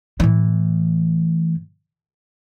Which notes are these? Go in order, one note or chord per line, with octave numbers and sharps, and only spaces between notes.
A2 E3